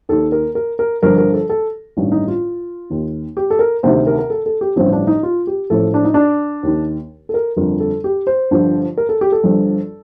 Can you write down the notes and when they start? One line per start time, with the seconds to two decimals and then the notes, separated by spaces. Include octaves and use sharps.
0.09 D#2 D#3 A4
0.32 A#4
0.55 A#4
0.79 A#4
1.02 G1 G2 D3 F3 A#4
1.18 A#4
1.33 A4
1.49 A4
1.97 A1 G2 D#3
2.12 D#4
2.28 F4
2.90 D#2 D#3
3.37 G4
3.50 A4
3.59 A#4
3.83 D2 C3 D#3 C5
4.07 A#4
4.19 A#4
4.30 A4
4.46 A4
4.61 G4
4.76 A1 G2 D3 F3 C4
4.92 D4
5.07 D#4
5.23 F4
5.47 G4
5.70 A1 A2 F3 A4
5.94 D4
6.05 D#4
6.14 D4
6.63 D#2 D#3
7.29 A4
7.34 A#4
7.57 G1 F2 D3 A#4
7.80 A4
8.04 G4
8.27 C5
8.51 G1 G2 D3 F3
8.97 A#4
9.09 A4
9.21 G4
9.32 A4
9.44 G1 G2 F3